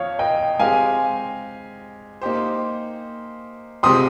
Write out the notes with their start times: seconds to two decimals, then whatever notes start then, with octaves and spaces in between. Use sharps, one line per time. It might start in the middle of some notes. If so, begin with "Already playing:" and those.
Already playing: F2 C#5 F5
0.19 D#5 G5
0.59 G#3 C4 G4 F5 G#5
2.21 A#3 D#4 G4 C5
3.83 C3 F3 G#3 C4 G4 C6 D#6